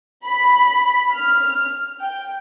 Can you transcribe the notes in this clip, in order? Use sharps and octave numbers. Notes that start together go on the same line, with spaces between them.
B5
F6
G5